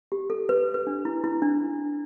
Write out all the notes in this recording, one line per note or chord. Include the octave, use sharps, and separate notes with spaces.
G4
A4
B4
B4
D4
E4
E4
D4